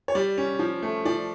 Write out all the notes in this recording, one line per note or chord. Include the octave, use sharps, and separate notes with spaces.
C#5
G3 D5
C#4
F3
A3
F3 D5